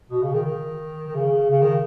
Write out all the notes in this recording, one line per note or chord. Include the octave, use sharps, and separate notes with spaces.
B2
C#3
D#3
D#3
D#3
C#3
C#3
D#3